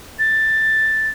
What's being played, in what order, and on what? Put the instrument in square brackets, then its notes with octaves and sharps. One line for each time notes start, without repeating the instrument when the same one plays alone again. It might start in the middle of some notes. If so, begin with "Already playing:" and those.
[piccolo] A6